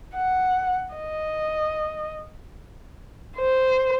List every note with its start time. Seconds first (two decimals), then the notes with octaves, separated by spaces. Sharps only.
0.15 F#5
0.95 D#5
3.37 C5